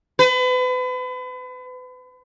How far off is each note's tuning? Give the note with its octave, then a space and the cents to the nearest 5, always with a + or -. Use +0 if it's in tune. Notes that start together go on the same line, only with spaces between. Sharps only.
B4 +35